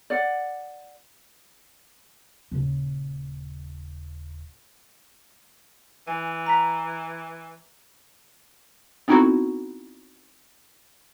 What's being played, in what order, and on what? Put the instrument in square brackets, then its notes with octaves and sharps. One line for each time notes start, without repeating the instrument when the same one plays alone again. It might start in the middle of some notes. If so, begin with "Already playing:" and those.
[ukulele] D5 F#5
[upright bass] D#1 C#3
[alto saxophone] E3 [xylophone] G#5
[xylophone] A#5 F#6 B6
[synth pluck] B3 C4 D#4 E4 F#4 A4